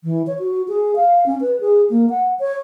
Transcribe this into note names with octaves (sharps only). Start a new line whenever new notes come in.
E3
C#5
F#4
G#4
F5
C#4
B4
G#4
A#3
F#5
C#5